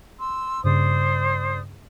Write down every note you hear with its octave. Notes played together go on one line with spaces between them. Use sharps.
C6 E6
G2 C#3 C5 D5 D#6